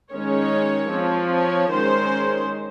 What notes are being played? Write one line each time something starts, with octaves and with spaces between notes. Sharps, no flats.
D#3 G#3 C#4 C#5
F3 C4
C#5
D#3 G#3 C#4 C5